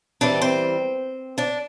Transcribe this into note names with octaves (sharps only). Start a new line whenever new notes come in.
E2 E3 G3 C4 D4 D5
C4 C5
D4 D5